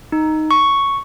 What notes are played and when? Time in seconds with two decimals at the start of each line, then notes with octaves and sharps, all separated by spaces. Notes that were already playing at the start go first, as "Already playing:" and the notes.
0.12 D#4
0.51 C#6